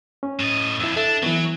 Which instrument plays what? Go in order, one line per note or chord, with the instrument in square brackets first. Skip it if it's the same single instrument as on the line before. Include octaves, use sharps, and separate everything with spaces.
[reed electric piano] C#4
[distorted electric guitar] A2 D#5
[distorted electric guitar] F2 D3 [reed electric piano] E4 E6
[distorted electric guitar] D4 [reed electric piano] A4 E5
[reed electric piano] E3 B3 [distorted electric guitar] F#3